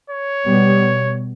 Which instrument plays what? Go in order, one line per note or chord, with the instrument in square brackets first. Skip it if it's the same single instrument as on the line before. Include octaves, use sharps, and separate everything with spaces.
[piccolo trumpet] C#5
[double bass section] B2 G3 B3